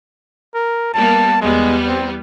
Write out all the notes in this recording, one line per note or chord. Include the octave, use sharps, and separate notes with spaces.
A#4
G3 A#3 B3 A5
E2 G3 G#3 B3
C4